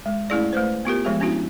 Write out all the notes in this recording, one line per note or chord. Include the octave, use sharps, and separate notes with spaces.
G#3
G#3 A3 C#4 E4 G#4 D5
A3 B4 C5
B3 F4 G4 A#4
F3 G#3 B3 G#4
B3 C#4 D4 E4 F#4